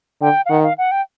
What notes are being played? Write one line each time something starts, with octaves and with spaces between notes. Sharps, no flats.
D3 G5
F5
D#3 F#5
F5
F#5
G5